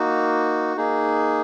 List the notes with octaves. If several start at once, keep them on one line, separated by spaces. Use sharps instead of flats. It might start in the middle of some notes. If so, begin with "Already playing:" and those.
Already playing: A#3 D#4 F#4
A#3 D#4 G#4